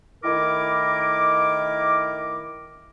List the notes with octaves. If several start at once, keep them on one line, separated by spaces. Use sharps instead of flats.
D#3 A3 E4 A#4 D6